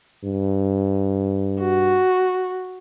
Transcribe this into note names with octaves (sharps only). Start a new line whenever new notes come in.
G2
F#4